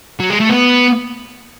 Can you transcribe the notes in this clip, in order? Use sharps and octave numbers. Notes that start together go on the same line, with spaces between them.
F#3
G#3
A3
B3